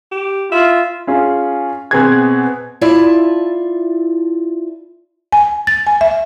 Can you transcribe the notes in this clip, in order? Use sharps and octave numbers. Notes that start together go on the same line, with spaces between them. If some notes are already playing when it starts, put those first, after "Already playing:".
G4
F4 E5
C#4 F4 G#4
B2 B3 C4 G#4 G#5 G#6
E4 F4 D5 E5 A5
G#5
A6
G#5
E5